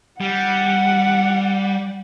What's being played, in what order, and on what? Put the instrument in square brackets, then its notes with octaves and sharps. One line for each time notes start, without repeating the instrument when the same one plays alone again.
[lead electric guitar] G3 [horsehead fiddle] F#5